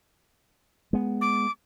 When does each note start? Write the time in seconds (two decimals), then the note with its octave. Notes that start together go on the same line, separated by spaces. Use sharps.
0.93 G#3 B3
1.21 D6